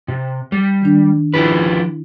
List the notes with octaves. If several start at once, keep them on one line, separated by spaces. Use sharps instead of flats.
C3
G3
D#3 D4
F3 E4 G4 B4